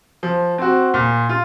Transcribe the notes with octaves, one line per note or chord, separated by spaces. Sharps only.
F3
C4 F#4
A#2
F4